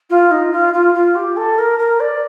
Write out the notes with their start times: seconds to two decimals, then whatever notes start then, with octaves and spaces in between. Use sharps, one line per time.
0.10 F4
0.31 D#4
0.52 F4
0.73 F4
0.94 F4
1.15 G4
1.37 A4
1.58 A#4
1.79 A#4
2.00 D5